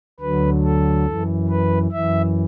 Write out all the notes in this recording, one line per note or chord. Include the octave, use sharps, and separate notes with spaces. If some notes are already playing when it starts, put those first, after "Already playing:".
D2 D3 F#3 B4
A4
F#2 E3
B4
F#2 E3 E5